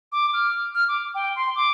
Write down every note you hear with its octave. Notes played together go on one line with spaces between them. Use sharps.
D6
F6
F6
D6
G5
C6
D6